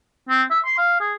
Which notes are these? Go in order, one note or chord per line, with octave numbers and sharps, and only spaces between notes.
C4
E5
C6
F5
G#4